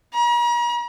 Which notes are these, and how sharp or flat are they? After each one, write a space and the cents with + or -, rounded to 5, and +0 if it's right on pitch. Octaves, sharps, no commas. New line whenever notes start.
A#5 +45